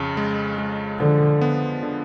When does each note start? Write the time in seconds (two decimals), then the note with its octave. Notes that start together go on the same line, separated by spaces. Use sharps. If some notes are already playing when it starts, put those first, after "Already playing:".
Already playing: F2 C#3
0.17 G#3
0.58 G#3
1.00 D3 F3
1.41 B3
1.83 D3